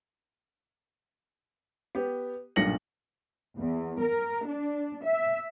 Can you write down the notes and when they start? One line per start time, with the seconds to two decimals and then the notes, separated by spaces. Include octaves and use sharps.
1.95 B3 G4
2.56 B1 G2 A#2 A#6 C#7 F#7
3.59 E2
4.03 A#4
4.46 D4
5.05 E5